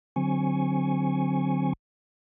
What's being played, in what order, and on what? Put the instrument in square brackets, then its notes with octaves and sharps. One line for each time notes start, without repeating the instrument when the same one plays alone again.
[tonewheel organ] D3 F#3 C4 G#5 C#6